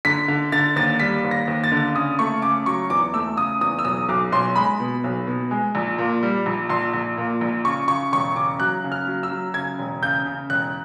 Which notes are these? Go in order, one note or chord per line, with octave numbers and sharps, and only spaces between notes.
D3 B6
D3
D3 A6
D#2 A6
G3 B6
D#2
A#6
D#2
A6
D3
C#3 D#6
A3 C#6
C#3 D6
F#3 C#6
E2 D6
A3 E6
C#3 D#6
E2 D#6
E6
B1 D#6
B1 D6
B1 C6
G#3 B5
B2
B1
B2
G#3
A#1
A#2
G3
A#1
A#1 C6
A#1
A#2
A#1
C#3 C#6
C#3 C#6
E1 C#6
C#3 D6
F#3 F#6
C#3
F6
F#3
E6
F#3
C#3 G#6
E1
C#3 G6
C#3
E1 F#6